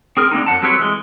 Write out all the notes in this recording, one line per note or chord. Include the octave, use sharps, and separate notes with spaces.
C4 G#4 A#4
D3 A#3 C4 D#4
F#2 F#5 A5
F#3 G3 C4 A4 B4 C#5
E3 G#3